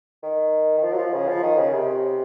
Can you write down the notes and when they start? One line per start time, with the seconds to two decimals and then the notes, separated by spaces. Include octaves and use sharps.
0.23 D#3
0.78 D#3
0.83 F3
0.92 F#3
0.98 F3
1.13 C#3
1.28 F3
1.43 D#3
1.58 C#3
1.73 C3